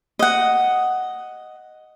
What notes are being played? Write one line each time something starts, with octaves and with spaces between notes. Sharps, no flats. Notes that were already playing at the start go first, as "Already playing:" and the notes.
D#5 F#5